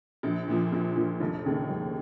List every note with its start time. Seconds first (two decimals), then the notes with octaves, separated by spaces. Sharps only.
0.23 A#1
0.48 A#2 F3
0.72 A#1
0.96 A#2 F3
1.20 F1
1.45 D#2 C#3
1.68 F1